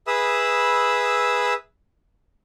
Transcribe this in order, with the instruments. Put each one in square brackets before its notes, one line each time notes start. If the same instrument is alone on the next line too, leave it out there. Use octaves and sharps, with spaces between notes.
[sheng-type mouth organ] G#4 B4 E5 B5 D#6 E6